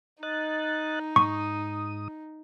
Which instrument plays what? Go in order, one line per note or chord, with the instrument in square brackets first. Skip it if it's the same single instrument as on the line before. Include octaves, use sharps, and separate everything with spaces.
[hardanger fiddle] D#4 [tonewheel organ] D#5 F#6 A6
[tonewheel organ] G#2 D#6 [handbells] C#6